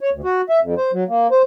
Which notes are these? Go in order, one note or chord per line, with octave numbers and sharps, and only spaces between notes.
C#5
D2
F#4
E5
F2
C5
F#3
A#3
C5